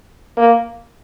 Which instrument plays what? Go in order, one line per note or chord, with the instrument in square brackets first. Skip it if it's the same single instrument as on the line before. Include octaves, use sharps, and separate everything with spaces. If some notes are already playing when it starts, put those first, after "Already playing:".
[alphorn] A#3